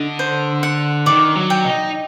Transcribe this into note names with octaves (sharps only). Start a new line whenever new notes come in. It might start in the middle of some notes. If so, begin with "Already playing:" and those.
Already playing: D3 D#5
C5
F#5
D#3 D5
F#3
G5
D#4